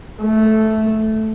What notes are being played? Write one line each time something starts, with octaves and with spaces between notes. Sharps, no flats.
A3